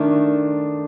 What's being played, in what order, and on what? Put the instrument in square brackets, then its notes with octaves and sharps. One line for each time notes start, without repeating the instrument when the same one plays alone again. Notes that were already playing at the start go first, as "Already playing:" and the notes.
Already playing: [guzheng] D#3 A3 D#4 [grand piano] D4